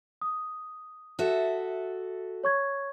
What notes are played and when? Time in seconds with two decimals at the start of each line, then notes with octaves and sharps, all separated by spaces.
0.22 D#6
1.19 F#4 A4 E5
2.44 C#5 C#6 G#6